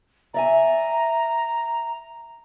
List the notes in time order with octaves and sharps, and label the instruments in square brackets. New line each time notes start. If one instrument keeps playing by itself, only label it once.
[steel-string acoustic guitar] D5 E5 G#5 [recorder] A#5